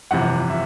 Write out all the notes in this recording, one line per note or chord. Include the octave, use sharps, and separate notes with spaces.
G1 F2 C3 E3 F#5
E5